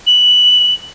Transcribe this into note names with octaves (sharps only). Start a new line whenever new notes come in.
F#7